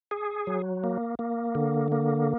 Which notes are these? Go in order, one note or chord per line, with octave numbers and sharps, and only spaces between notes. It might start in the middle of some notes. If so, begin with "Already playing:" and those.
G#4
F#3
A#3
A#3
D3
A#3